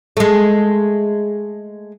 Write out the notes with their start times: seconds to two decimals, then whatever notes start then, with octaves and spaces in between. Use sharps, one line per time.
0.17 G#3 A3